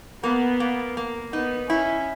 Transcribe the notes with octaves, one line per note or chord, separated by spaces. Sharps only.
A#3 B3
A#3
A#3
B3 D#4
C#4 E4